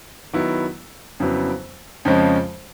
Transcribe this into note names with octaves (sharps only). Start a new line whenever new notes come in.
D#3 F#3 B3 E4
F2 C#3 F#3 B3 E4
F2 C#3 F3 G#3 C#4